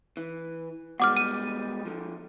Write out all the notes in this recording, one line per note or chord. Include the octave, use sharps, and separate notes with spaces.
E3
B2 G3 G#3 F#5 D6 F6
D#7
D3 F3